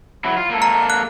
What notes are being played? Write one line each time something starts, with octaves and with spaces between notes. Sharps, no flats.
F#3 E4
F4
A#3 A4
A#5
F#6